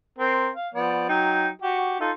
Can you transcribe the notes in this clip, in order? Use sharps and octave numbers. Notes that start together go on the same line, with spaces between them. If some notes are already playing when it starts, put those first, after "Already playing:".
C4 A#4
F5
F3 B3 D5
F#3 D#4 G5
F#4 G4
D#4 F4 A4